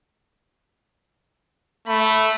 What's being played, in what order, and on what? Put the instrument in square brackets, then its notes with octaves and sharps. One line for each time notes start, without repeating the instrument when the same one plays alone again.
[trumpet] A3 [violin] B5